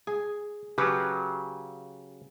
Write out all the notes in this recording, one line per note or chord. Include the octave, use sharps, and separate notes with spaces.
G#4 G#5
C#3 F#3 G4 B4